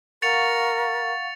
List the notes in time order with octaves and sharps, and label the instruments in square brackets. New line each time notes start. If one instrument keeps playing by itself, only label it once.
[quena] A#4 [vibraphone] F5 F#5 C#6 [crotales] A6 C#7 F7